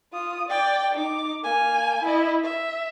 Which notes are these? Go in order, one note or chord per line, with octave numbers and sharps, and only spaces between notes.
F4 D#6
D5 G5
D#4 D6
A#3 G#5
E4 D#5
E5